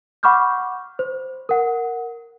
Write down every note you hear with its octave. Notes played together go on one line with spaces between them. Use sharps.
F#5 B5 C#6 D6 F6 G6
C5
A#4 F#5